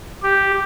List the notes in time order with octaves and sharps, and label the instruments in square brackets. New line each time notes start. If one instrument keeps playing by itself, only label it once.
[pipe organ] G4